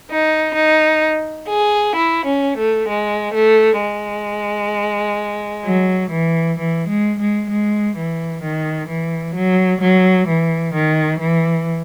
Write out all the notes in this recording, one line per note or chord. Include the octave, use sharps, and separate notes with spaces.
D#4
D#4
G#4
E4
C#4
A3
G#3
A3
G#3
F#3
E3
E3
G#3
G#3
G#3
E3
D#3
E3
F#3
F#3
E3
D#3
E3